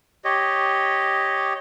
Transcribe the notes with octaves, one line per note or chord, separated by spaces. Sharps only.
G4 C#5 D#5